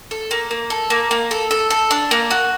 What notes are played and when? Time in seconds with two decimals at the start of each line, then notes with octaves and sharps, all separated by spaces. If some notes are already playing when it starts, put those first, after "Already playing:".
0.11 A4
0.31 A#3
0.51 A#3
0.70 A4
0.90 A#3
1.11 A#3
1.31 A4
1.51 A4
1.70 A4
1.91 D4
2.11 A#3
2.31 F#4